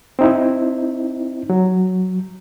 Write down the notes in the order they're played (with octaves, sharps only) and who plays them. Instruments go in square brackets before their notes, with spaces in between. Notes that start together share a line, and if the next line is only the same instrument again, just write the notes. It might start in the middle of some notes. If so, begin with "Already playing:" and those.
[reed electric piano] C4 D#4 E4
F#3